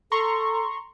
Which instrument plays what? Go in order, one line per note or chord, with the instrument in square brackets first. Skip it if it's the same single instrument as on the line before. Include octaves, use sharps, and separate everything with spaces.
[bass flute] A4 [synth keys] A#5 C6 C#6